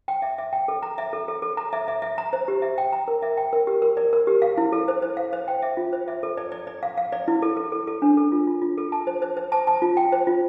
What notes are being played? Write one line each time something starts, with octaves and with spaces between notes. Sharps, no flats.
G5
E5
E5
G5
A4
A#5
E5
A4
A4
A4
A#5
E5
E5
E5
A#5
C5
G4
E5
G5
A#5
A#4
E5
G5
A#4
G4
A#4
D5
A#4
G4
F5
E4
A4
C5
C5
F5
C5
G5
E5
F4
C5
E5
A4
D5
D5
D5
F5
F5
D5
E4
A4
A4
A4
A4
D4
A4
F4
F4
F4
A4
A5
C5
C5
C5
A5
A5
F4
G5
C5
F4